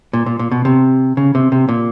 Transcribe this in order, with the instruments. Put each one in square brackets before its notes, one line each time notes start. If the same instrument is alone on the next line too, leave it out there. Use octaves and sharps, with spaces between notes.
[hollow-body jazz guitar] A#2
A#2
A#2
B2
C3
C#3
C3
C3
A#2